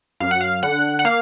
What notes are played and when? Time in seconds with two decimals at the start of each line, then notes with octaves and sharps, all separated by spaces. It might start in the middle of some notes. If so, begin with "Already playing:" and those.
0.20 F#2 F5
0.31 F#5
0.41 F5
0.63 D3 F#5
0.99 F#5
1.05 A#3 F5